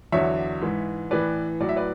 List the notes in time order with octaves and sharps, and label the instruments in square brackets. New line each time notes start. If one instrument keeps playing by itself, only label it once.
[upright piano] E2 D3 F#3 C#5 E5
G#2 E3
A2 E3 B4 D5
A2 F#3 D5
E5
B4 D5